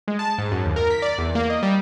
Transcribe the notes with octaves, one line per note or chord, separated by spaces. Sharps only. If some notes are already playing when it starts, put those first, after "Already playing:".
G#3
A5
G#2
F#2
D#2
A#4
B6
D5
E2
A#3
D#5
G3